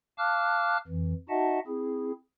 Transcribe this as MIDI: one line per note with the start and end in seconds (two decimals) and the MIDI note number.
0.18 0.77 77
0.18 0.77 81
0.18 0.77 86
0.18 0.77 89
0.18 0.77 90
0.88 1.13 41
0.88 1.13 52
1.29 1.59 63
1.29 1.59 66
1.29 1.59 75
1.29 1.59 76
1.29 1.59 78
1.29 1.59 81
1.67 2.11 60
1.67 2.11 64
1.67 2.11 68